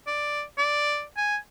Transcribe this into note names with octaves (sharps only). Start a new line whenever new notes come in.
D5
D5
G#5